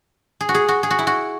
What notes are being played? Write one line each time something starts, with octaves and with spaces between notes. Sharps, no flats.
G#4
F#4
G#4
F#4
G#4
F#4
E4
F#4